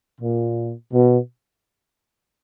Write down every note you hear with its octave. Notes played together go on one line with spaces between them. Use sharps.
A#2
B2